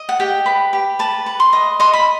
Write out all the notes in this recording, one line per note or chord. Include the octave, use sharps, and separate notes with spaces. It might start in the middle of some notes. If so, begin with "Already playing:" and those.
Already playing: D#5
F#5
G4 G5
B4
G4
B4 A5
B4
C6
D#5
D#5 C6
B5